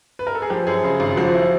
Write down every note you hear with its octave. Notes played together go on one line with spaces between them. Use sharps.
B4
A#4
A4
G#4
F3 G4
F#2 G#4
C#3 G#4
G#1
F4
F3 F#4
E4